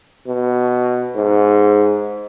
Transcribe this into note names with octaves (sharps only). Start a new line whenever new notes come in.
B2
G#2